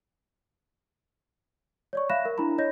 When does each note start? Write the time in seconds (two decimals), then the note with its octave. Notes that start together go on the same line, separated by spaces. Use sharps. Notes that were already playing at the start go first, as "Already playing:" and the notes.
1.93 C#5 D5 C#6
2.10 E5 F5 B5 F#6 A#6 E7
2.25 A#4
2.38 D4 E4 A#5 B5
2.58 C#5 D#5 G6 A#6